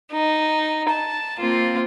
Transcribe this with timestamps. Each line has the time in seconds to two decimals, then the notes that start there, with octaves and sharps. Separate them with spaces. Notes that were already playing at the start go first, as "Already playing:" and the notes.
0.12 D#4
0.88 A5
1.40 A#3 C4 F4